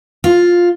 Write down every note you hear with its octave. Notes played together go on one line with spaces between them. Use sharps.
F4